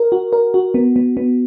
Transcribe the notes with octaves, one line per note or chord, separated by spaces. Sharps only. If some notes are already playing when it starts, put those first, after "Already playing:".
Already playing: A#4
F#4
A#4
F#4
B3
B3
B3